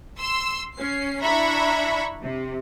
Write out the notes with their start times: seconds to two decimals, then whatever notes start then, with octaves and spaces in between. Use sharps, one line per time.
0.18 C6 E6
0.77 C#4 C7
1.21 D4 E4 E5 A#5 B5 C#6
2.22 C3